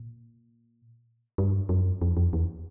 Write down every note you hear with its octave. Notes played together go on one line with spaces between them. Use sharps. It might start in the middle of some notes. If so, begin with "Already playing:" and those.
Already playing: A#2
G2
F#2
F2
F2
E2